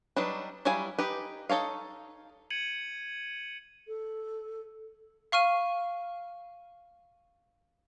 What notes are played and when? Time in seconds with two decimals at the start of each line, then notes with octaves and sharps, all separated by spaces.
0.16 F#3 G3 D4 D#4 B4
0.65 F#3 G3 E4 F5 G#5
0.98 D#4 G4 B4
1.49 D#4 A4 C#5 F5
2.50 G#6 C#7 D#7 F#7
3.88 A4
5.32 F5 C#6 F6 D#7